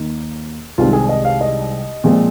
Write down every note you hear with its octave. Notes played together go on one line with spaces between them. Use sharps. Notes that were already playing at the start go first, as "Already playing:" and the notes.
Already playing: D#2 A#3 D#4
C2 C3 D#3 G#3 C4 F4
G#4
D#5
F5
D#5
A#2 F3 G#3 C4